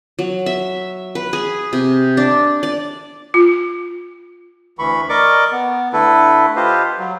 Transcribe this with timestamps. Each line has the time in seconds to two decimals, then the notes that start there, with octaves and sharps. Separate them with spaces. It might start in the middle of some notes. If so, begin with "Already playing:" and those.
0.19 F#3
0.46 E5
1.15 B4
1.33 G#4
1.73 C3
2.17 D4
2.63 D5
3.34 F4
4.79 D2 E3 B5 C#6
5.09 A#4 D5 D#5 C#6 D6
5.52 B3
5.93 D3 A3 E4 A4 B4
6.56 F4 G4 B4 C5 D#5 F5
6.99 F#3